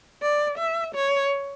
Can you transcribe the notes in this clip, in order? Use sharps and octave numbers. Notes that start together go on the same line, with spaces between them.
D5
E5
C#5